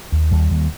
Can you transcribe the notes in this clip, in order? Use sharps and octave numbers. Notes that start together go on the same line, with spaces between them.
D#2
D#2 G3
D#2